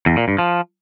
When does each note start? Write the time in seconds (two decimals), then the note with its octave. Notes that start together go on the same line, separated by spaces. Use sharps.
0.06 E2
0.17 A#2
0.28 G2
0.38 F3